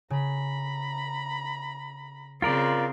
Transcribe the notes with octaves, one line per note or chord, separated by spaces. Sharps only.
C#3 A#5 B5
C#3 C4 F4 A#4 D5 C6 B6